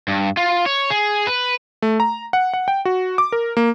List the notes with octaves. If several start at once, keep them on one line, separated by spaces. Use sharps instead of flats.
G2
F4
C#5
G#4
B4
A3
A#5
F#5
F#5
G5
F#4
D6
A#4
A#3